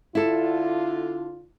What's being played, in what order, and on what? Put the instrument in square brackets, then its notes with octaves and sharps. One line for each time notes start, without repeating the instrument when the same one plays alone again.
[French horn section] D3 F4 [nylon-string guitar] E4 A4